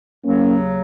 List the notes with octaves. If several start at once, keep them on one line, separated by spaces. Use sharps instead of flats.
D#2 C#3 F#3 A#3 C#4